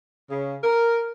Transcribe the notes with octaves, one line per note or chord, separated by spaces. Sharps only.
C#3
A#4